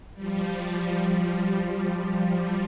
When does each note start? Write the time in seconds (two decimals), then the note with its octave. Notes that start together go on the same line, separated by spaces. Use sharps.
0.14 F3 G3